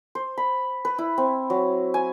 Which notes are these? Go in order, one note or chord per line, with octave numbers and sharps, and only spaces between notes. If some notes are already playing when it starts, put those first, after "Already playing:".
C5
B5
B4
E4
C4
F#3
G#5